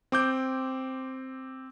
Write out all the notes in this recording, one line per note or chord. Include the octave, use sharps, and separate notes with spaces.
C4 D6 G6